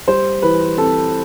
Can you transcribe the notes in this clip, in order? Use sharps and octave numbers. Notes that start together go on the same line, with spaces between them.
G3 C5
E3 B4
C4 A4